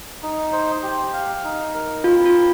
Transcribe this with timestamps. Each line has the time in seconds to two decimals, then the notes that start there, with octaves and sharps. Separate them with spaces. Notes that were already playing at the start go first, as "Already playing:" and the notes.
0.22 D#4
0.52 C5
0.83 G4
1.13 F5
1.44 D#4
1.74 A#4
2.04 C4 F4
2.25 F4
2.36 C4